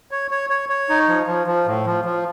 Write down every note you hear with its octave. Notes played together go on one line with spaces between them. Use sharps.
C#5
C#5
C#5
C#5
D#4
F3
F3
F3
A2
F3
F3